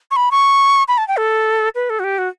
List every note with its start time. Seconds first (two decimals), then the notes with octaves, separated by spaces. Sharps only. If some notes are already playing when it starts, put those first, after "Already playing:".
0.11 C#6
0.16 B5
0.31 C#6
0.88 B5
0.98 A5
1.08 G5
1.17 A4
1.75 B4
1.90 A4
1.99 F#4
2.04 G4
2.18 F#4